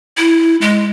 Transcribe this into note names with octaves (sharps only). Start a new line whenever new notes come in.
E4
G#3